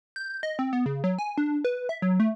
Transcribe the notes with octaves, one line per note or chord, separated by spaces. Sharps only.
G6
D#5
C4
B3
C#3
F#3
G#5
D4
B4
E5
F#3
A3